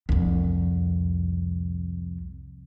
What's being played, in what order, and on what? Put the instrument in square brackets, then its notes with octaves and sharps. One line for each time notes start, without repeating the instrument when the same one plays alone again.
[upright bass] C2 F2